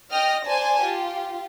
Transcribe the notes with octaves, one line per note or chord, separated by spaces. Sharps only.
D#5 G5 D#6 F6 A#6
C5 D5 G#5 A5
F4 G4